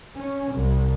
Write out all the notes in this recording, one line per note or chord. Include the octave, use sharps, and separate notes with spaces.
C#4
C2